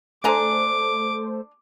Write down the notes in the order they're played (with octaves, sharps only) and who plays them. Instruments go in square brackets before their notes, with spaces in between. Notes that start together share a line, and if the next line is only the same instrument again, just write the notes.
[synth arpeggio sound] A3 A4 C5 [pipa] D4 G#5 A#5 [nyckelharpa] D6